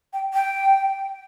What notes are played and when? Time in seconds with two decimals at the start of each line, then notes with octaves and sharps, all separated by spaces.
0.13 G5
0.34 G5